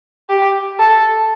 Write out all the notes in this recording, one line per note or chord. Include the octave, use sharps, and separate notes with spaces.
G4
A4